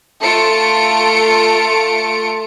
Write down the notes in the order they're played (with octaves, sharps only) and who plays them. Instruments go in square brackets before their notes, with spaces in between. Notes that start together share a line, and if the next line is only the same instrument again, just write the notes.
[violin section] A3 F4 A4 C#7 D7